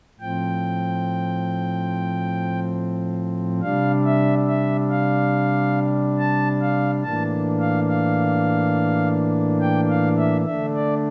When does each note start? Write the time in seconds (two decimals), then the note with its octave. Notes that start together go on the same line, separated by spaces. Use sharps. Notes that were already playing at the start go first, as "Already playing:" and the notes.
0.19 A2 F3 C4 G5
3.62 C3 G3 D4 F5
4.05 E5
4.47 E5
4.90 F5
6.18 A5
6.61 F5
7.03 A2 E3 A#3 D4 A5
7.60 F5
7.89 F5
9.61 G5
9.89 F5
10.17 E5
10.45 D3 A3 D4 E5
10.75 D5